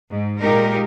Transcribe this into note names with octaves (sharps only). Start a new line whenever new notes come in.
G#2
A#2 G#3 D#4 G4 A#4